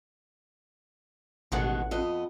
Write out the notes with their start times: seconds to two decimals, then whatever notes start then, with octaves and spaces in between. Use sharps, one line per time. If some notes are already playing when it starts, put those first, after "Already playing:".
1.52 A1 B2 D#3 G#3 F#5
1.91 F2 B3 D#5